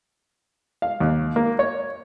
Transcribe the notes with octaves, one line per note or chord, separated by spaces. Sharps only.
F5
D#2
A#3
C#5